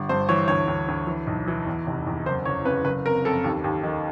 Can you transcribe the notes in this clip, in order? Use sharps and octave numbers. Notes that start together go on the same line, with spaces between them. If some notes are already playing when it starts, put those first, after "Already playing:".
Already playing: G1
G2 C5
E3 C#5
D2 C#5
D2
D2
E3
B1
E3
E2
F1
E2
F#1 C5
F#1 C#5
C#3 B4
F#1 B4
C3 A#4
F2 A4
D#2
D#2
D#3